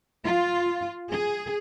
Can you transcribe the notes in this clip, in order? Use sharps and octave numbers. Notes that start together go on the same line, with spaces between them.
F4
G#4